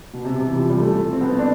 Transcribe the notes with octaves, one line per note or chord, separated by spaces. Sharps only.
B2
C3
C3
E3
F3
G3
A3
C4
B3
C4
D4